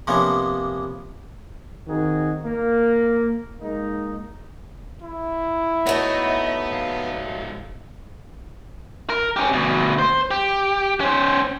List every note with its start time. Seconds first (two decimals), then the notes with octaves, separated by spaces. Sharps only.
0.07 C3 F3 A#3 B3 C#4 D4
1.87 D#3 C4 D#4 F#4 G#4
2.44 A#3
3.61 G#3 A#3 D#4
5.02 E4
5.87 F#3 A3 B3 D#4 D#5
6.71 G#2 F5
9.09 A#4
9.37 C#4 G4
9.53 D2 B2
9.99 C5
10.31 G4
11.00 C#4 C5